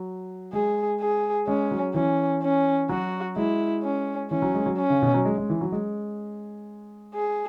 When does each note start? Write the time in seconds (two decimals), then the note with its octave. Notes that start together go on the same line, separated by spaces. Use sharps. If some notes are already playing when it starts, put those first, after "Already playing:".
Already playing: F#3
0.53 G#3 G#4
1.00 G#4
1.47 G#3 C#4
1.71 F#3
1.94 E3 C#4
2.43 C#4
2.89 F#3 F#4
3.36 G#3 E4
3.84 C#4
4.31 E3 C#4
4.42 F#3
4.55 G#3
4.66 F#3
4.78 C#4
4.90 C#3
5.02 B2
5.14 F#3
5.25 G#3
5.38 G#3
5.50 E3
5.61 F#3
5.72 G#3
7.15 G#4